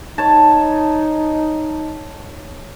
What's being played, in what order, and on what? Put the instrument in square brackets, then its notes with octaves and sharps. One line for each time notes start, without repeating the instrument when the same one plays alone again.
[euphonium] D#4 [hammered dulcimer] C#5 A5